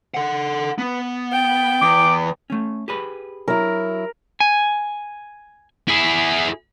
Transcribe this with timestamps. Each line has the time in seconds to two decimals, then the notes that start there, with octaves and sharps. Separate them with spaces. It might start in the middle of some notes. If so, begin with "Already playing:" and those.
0.14 A4 F#5
0.78 B3
1.32 G5
1.82 E2 D6
2.50 A3 C#4
2.88 G4 G#4 B4
3.48 F#3 E4 A#4
4.40 G#5
5.88 E4 G#4